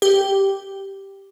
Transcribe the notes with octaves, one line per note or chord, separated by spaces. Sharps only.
G4